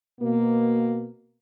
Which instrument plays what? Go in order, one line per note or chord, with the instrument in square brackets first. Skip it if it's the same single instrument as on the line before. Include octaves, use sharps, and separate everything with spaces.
[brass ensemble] B2 A#3